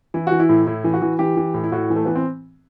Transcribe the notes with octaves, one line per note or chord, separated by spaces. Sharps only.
E3 E4
E3 F#4
E4
A2
A2 E4
E3
F#4
E3
E3 G4
E3
A2
E4
A2 F#4
E3
A3
E3 B3
C4